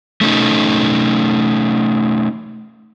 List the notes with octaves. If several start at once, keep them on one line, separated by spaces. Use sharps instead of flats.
A3 C#4 D#4